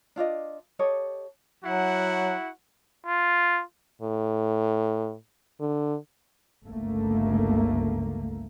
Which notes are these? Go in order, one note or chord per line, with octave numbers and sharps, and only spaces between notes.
D4 F4 D5 D#5
G4 A4 C#5 D#5
F#3 E4 F#4 F#5
F4
A2
D3
G1 C#2 A3 A#3